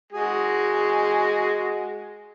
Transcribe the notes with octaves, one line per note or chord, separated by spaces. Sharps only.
G#3 F#4 G#4